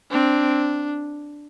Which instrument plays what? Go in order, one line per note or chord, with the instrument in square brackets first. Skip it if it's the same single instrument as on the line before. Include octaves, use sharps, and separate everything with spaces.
[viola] C4 [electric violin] D4